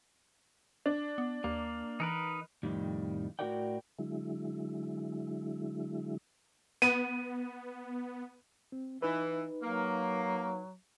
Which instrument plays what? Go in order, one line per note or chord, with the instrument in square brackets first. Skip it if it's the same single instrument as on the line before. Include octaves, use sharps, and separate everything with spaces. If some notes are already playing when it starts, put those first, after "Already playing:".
[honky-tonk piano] D4
[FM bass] B3
[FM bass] D#2 [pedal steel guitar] A#3
[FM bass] E3 [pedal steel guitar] D#4 A#4 B4
[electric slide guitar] F2 A2 D#3 G3
A2 C#4 F#4 A#4 D5 G5
[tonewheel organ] D3 F#3 G#3 E4
[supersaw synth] B3 [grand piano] D#7
[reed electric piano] C4
[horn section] E3 [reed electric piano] D#4 B4
[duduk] F#3 [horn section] A#3